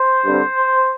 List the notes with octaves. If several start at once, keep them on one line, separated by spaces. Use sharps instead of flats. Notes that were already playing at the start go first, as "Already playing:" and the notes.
Already playing: C5
G2 D3 G3 C4